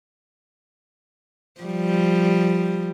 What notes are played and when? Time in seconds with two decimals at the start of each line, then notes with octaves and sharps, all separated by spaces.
1.61 F3 G3